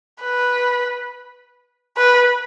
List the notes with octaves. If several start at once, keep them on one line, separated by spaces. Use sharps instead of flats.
B4
B4